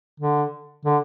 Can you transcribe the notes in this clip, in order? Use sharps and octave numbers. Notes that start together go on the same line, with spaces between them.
D3
D3